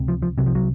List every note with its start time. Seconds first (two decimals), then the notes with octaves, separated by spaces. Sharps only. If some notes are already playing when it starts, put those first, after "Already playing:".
Already playing: C#2 C3
0.08 F3
0.22 F3
0.38 C2 C3 F#3
0.46 F3
0.55 F#3